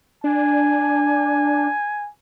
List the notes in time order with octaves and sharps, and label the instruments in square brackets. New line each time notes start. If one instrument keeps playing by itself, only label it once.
[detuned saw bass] D4 [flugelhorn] G#5